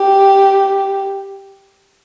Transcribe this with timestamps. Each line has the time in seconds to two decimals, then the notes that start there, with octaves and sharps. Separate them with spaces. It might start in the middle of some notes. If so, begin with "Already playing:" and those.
Already playing: G4